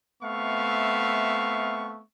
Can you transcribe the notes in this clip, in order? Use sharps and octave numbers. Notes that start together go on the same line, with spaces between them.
A3 B3 C4 E5 F5 C#6